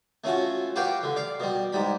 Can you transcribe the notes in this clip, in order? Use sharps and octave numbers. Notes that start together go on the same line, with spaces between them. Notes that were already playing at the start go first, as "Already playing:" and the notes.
A3 C#4 F4 F#4
F#4 G4 B4 F5 G5
D3
D5 F5
B2 G3
G#2 G3 B5